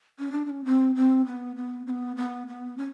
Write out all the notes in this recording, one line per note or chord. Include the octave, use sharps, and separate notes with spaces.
C#4
D4
D4
C#4
C4
C4
B3
B3
C4
B3
B3
B3
C#4